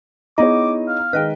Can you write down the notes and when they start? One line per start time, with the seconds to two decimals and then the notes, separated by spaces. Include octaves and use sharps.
0.38 B3 D#4 E4 G#4 C#5 D#5 D6
0.88 F5
1.13 D#3 G#3 B4 D#5 G5